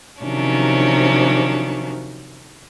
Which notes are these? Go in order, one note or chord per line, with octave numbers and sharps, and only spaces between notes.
C3 D#3 F3 F#3 C#4 D4